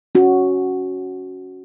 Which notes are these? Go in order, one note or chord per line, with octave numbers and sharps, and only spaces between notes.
C#4 F#4